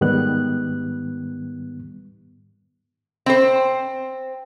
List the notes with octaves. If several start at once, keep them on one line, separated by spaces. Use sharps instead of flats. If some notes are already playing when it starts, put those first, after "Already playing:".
G#2 D#3 G3 B3 F#6
C4 C5